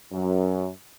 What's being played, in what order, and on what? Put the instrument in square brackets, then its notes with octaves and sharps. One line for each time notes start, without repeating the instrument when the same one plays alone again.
[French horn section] F#2